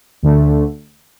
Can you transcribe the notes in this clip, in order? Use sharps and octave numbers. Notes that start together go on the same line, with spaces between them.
D2 D3 A3